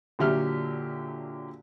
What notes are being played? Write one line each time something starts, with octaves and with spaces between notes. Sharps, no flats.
A#2 D3 F#3 G4 E5 F6